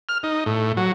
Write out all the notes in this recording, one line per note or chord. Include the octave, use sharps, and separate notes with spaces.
F6
D#4
A2
F#3